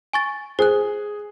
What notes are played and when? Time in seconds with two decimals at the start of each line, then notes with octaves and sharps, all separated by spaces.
0.13 G#5 C#6 A6
0.59 G#4 C5 F#6